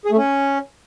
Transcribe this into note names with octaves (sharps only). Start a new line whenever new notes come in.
G#4
A3
C#4